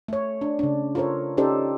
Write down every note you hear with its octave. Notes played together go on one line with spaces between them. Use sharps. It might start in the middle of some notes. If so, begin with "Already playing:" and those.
A3 C#5
D4
C#3 D4
F4 A4 A#4 C5 C#5
C#4 D#4 G4 A4 C5 D5